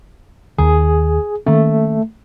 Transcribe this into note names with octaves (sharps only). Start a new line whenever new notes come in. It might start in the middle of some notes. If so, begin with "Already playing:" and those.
D#2 D#3 G#4
D#3 A3 A#3 C#4